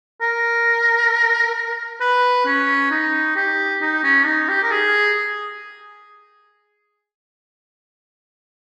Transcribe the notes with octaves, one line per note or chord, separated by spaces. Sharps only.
A#4
B4
C#4
D#4
G4
D#4
C#4
D#4
G4
A#4
G#4